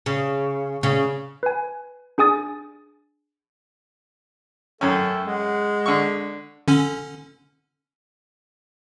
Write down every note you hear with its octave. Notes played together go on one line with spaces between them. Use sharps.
C#3
C#3
B4 G#5
D4 G#4 G#5 D#6 A6
F#2 A3 C#4 A4 E5 G5
G#3 F#5
D3 C#6
D3 C#4